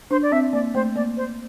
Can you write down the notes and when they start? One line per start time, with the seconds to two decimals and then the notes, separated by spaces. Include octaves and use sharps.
0.11 D4 C5
0.22 D5
0.32 C4 E5
0.53 A#3 D5
0.74 A3 C5
0.95 A#3 D5
1.17 C5